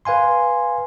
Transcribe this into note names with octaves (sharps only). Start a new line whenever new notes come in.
B4 F5 G#5 C6